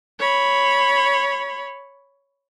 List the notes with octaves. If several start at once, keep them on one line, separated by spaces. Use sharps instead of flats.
C#5 B5